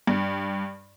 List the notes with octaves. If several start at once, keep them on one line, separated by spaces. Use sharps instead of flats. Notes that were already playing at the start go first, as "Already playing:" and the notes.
G2